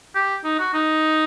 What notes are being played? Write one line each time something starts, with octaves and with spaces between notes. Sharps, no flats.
G4
D#4
F#4
D#4